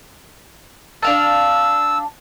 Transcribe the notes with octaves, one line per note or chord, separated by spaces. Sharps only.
D4 F5 A5 E6